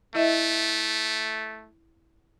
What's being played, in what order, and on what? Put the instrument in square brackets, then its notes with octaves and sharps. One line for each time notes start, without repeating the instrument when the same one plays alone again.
[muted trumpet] A3 [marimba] E4 D#5 E5